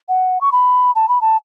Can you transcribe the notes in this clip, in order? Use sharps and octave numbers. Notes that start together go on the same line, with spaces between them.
F#5
C#6
B5
A5
B5
A5